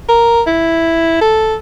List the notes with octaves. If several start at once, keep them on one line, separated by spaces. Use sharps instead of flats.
A#4
E4
A4